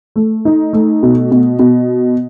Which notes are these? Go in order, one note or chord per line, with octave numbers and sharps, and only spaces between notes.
A3
D#4
A3
B2
B2
B2